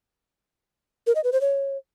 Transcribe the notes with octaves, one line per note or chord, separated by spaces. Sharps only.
A#4
D#5
B4
C5
C#5